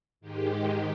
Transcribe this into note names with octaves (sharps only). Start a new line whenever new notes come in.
G#2 D#3 G#3 G4